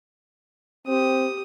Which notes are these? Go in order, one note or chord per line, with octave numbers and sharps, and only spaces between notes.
C4 G4 D#6